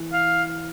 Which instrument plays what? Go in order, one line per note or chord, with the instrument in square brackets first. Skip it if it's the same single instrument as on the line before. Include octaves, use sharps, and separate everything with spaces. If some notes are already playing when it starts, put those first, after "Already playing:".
Already playing: [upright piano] E3
[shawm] F5